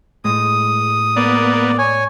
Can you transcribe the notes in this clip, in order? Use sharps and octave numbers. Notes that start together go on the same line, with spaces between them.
A2 G#3 D#6
A#3 B3 D5
C#5 G#5